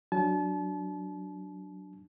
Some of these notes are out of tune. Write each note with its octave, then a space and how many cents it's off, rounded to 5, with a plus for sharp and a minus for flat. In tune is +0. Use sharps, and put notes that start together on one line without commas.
F#3 +0 D4 +0 A5 -35